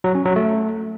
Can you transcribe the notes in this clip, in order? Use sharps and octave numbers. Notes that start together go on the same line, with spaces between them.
F#3
C#4
F#3
A3